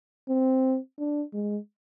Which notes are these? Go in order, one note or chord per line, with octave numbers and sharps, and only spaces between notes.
C4
D4
G#3